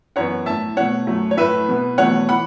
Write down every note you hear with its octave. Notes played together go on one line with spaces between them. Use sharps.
F#2 E3 B3 C#5 F#5
A2 A3 E5 A5
B2 A3 C#5 F#5
F#2 F#3 A3
C#5
A2 A3 B4 E5
B2 B3
E2 B2 F#3 A3 C#5 F#5
E3 F#5 B5